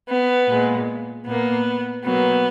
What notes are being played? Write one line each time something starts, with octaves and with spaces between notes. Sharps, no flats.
B3
A#2 G#3
A#2 A#3 B3
B2 F#3 A#3 B3